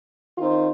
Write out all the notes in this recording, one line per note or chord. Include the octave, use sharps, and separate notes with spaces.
D#3 C4 D#4 F4